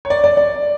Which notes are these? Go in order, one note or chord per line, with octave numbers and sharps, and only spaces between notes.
C#5
D5
D5
D5